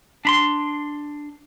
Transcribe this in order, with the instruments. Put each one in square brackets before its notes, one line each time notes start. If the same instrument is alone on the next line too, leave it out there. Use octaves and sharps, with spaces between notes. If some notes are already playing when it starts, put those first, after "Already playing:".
[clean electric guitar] D4 B5 C6